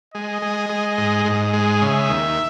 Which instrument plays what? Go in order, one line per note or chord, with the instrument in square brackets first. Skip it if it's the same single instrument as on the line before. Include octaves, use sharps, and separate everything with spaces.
[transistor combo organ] G#3 [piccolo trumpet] D#5
[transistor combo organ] G#3
G#3
G#2
G#2
G#3
[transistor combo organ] C#3 [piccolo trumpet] E5
[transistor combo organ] D#2